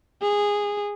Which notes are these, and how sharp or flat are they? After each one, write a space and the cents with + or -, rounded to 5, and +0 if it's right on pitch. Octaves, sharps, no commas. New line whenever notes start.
G#4 -15